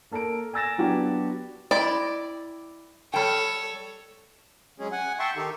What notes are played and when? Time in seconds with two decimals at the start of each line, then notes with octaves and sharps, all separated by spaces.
0.11 A#3 A4 A#4 A#5 D7
0.53 G#5 A#5 E6 A6 A#6 E7
0.78 F#3 B3 D4 F#4 G4
1.71 E4 D5 D#5 G5
3.14 G3 A4 C#5 G5
4.79 F#3 G#3 C#4 G#4
4.92 F#5 G#5
5.19 E5 G5 A5 C6 C#6
5.36 D#3 D#4 G4 A4